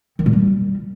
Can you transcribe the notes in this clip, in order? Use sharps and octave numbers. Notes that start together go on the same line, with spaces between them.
D#3
A#2
G3